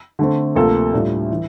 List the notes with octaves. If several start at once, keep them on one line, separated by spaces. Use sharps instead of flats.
D3 A3 C4
D2 C3 F3 A#3 F4 A4
A2 G3 D4 F4
E3